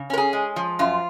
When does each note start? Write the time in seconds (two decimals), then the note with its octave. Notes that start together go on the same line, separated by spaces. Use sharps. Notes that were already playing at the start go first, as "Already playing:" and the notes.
Already playing: C#3
0.10 C#4 A#4
0.18 G#4
0.33 G#3
0.56 F3
0.79 F#2 F4